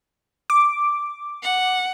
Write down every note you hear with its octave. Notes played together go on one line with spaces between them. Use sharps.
D6
F#5